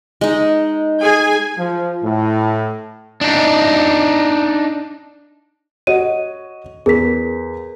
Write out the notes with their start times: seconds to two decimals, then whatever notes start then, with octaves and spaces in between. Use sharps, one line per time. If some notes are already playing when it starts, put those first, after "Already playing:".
0.21 G#3 D#4
1.02 G#4 G#5
1.58 F3
2.03 A2
3.21 D4 D#4
5.87 F#4 C#5 D#5 D#7
6.86 E2 G#4 A#4 B6